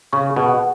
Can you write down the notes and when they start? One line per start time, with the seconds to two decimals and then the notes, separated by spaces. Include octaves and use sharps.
0.13 C#3 C#6
0.30 G#4
0.36 B2
0.49 F#5